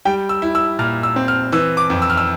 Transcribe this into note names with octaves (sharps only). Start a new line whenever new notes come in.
G3 G5
E6
E4
E6
A#2 F6
E6
C4
F6
E3 E6
D6
F2
E6
F6
E6